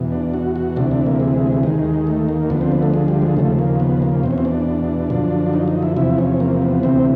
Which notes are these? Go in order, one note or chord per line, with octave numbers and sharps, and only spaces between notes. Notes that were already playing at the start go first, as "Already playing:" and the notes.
Already playing: E2 B2
D4
F#4
F#4
D2 C3 E3 D4
D4
A#3
G#3
D#2 D#3 G#3
A3
A#3
D2 D3 F3 B3
C4
B3
A3
G#3
G3
G#3
D#2 C#3 F3 A3
A#3
B3
A#3
E2 B2 C4
C#4
C4
D4
F#2 D3 F3
D#4
D#4
E4
E2 C3 F3 E4
C#4
A#3
B3
D2 C3 E3 C4